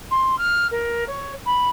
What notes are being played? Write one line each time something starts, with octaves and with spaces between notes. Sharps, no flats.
C6
F6
A#4
C#5
B5